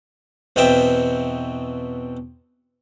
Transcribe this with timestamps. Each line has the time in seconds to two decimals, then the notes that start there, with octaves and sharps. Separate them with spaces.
0.56 E2 B2 C4 E5 G5